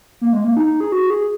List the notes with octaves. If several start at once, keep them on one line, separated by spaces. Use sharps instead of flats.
A#3
G#3
A#3
D#4
G#4
F#4
G#4